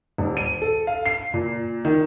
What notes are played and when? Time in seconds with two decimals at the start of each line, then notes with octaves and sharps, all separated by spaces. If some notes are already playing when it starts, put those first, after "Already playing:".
0.18 D#1
0.37 D#7
0.62 A4
0.87 F5
1.06 C7
1.34 A#2
1.85 D#3